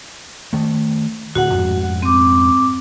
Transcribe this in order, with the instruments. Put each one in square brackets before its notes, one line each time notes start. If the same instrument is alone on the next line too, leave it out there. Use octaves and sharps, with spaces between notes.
[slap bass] D#3 A3
[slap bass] D1 [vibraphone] F#4 F#5
[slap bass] F2 G#2
[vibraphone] C4 D6